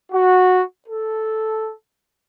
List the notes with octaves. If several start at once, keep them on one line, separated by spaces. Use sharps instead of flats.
F#4
A4